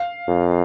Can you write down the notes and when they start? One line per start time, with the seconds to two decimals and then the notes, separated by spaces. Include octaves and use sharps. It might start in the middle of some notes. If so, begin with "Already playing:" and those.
Already playing: F5
0.28 F2